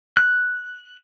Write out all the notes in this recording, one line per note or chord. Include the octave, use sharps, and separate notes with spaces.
F#6